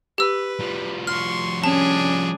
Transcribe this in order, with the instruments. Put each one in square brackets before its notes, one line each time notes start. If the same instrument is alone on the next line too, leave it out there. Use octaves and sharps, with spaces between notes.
[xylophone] G4 E6 [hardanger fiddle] B4
[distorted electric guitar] F3 G3
[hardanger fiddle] C6 C#6 [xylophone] F6
[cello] C#4 [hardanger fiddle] D4 G#4 [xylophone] A5